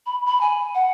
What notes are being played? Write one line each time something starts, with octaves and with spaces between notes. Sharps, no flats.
B5
B5
G#5
F#5